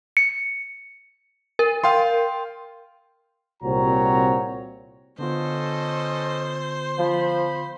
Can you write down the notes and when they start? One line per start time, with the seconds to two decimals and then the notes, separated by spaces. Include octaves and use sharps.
0.17 C#7
1.59 A#4
1.84 F5 G5 C6
3.63 C2 A#2 C4 F#4 C#5 A#5
5.19 D3 B3 C#4 F4 A4 C5 D#5
6.98 F3 B5